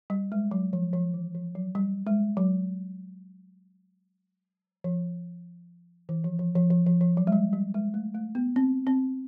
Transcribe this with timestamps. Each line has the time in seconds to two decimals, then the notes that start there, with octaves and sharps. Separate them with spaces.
0.10 G3
0.32 G#3
0.51 F#3
0.73 F3
0.93 F3
1.14 E3
1.35 F3
1.55 F#3
1.75 G3
2.07 G#3
2.37 F#3
4.84 F3
6.09 E3
6.24 F3
6.39 F3
6.55 F3
6.70 F3
6.86 F3
7.01 F3
7.17 F#3
7.27 G#3
7.32 G3
7.53 G3
7.74 G#3
7.94 A3
8.15 A3
8.35 B3
8.56 C4
8.87 C4